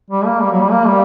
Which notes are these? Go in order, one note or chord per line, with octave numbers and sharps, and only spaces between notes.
G3
A#3
G3
F#3
G3
A#3
G3